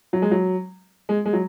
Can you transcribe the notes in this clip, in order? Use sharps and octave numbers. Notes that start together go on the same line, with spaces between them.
F#3
G#3
F#3
G#3
G#3
F#3